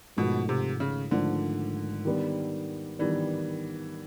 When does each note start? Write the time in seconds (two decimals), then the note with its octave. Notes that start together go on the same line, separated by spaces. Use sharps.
0.17 G#1 G#2 B2 F3 A3
0.49 C3
0.80 C#3
1.11 G#1 G#2 D3 F3 A3
2.05 D#3 G3 B3 D4
2.99 D#3 E3 G3 B3 D4